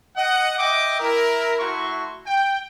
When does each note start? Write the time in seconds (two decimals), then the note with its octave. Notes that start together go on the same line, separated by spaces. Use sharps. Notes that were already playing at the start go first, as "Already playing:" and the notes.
0.16 D#5 F#5
0.59 D#5 E5 G5 D6
1.00 E4 A#4
1.60 A3 E4 F#4 C6 C#6
2.26 G5